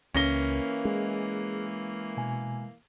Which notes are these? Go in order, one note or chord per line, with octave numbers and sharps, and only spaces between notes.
C#2 E3 A#3 C#4 A#6 G7
G#3 G#4
B2 G#5